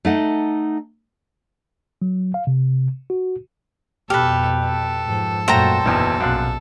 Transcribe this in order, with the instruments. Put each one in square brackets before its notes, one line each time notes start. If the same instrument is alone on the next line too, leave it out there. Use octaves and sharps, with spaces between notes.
[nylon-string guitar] A3 D#4 F#5
[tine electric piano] F#3
F5
C3
F#4
[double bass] F2 B2 [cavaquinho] G4 B4 [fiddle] A4 [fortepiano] F6
[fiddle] A4
[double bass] G#2 F3
[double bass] F#2 A#2 [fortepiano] A3 F#4 [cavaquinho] C5 G5 A#5
[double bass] F#1 [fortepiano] B1 E2 B2
[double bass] A#1 B2 [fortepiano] F#2 F5 F#6